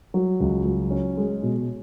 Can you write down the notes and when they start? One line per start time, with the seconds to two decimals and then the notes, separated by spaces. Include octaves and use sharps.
0.14 F#3
0.40 C#2
0.66 F#3
0.91 C#4
1.17 G#3
1.43 B2